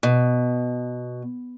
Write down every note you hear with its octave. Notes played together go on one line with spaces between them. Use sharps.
B2